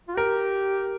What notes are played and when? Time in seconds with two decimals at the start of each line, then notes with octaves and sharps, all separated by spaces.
0.08 F4
0.16 G4 A#4